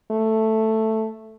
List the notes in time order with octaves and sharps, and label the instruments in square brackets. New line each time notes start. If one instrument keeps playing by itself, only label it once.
[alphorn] A3